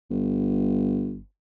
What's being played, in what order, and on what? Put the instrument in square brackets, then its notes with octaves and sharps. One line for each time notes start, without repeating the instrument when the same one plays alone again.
[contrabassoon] G1